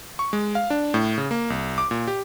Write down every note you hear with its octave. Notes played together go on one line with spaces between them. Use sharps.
C#6
G#3
F5
D4
A2
C#3
A#3
C2
D6
A#2
G4